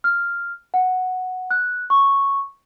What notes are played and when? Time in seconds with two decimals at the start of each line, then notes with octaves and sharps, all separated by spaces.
0.04 F6
0.74 F#5
1.51 F#6
1.90 C#6